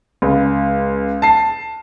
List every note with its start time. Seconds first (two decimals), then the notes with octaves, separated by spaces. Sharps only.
0.22 C#2
1.22 A5 C7